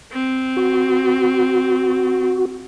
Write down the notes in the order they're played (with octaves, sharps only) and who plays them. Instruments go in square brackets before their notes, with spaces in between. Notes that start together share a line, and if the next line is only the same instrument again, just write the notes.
[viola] C4
[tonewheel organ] F#4